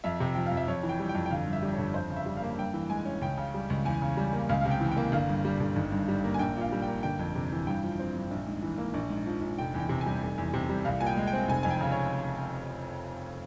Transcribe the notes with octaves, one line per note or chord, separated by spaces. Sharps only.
F2 E5
C3
F3 G5
F5
F2
E5
F2 C#5
E3
G5
G3
G5
F2
G5
G1 F5
G2
E5
G3
G1 C#5
F2 C5
C#3
E5
G3
F5
A#3
G2 G5
E3
G#3 G#5
C#4
C#2 G5
C#3
G3
C#2
E2 G#5
C#3
G3
A#3
C#2 F5
C3 F5
G5
E3
G5
A#3
G1 F5
G2
G3
G1
G#1
G2
G3
A#3
G#5
A#1 G5
A#2 F5
G3
G5
A#3
G1 G5
F2
C3
E3
G2 G5
F3
C4
G2
A#1
G#2
E3
A#3
A#1
G#2
F3
A#1
F1 G5
E2
G5
C3
G#5
G3
F1
E2
C3
G3
C2 F5
A#2 G#5
G5
G#3
G5
C4
F1 G#5
F2 G#5
G5
C#3
C#5